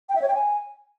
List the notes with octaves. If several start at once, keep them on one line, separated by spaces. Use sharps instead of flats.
G5
E5
C#5
G5
G#5